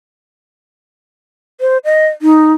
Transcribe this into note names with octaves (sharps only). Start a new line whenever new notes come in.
C5
D#5
D#4